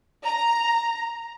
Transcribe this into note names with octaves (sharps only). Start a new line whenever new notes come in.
A#5